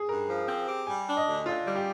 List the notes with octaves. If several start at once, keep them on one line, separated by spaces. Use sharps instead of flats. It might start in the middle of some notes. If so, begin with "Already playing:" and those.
Already playing: G#4
G2 A#4
F3
C4
G4
G3 G#5
D4
D#5
D2
D3 F4
G3
G4